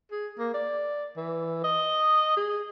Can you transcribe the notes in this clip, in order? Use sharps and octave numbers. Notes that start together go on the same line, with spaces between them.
G#4
A#3
D5
E3
D#5
G#4